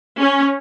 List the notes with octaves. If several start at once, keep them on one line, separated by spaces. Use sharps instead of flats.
C#4